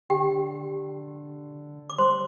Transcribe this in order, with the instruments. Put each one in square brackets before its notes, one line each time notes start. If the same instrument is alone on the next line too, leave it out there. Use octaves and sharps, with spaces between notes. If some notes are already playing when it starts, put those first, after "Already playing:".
[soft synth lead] D3 [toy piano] G4 G5
[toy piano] D6
[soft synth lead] G3 [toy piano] C5 C6